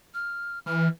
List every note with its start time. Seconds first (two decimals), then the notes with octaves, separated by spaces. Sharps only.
0.14 F6
0.66 E3 F6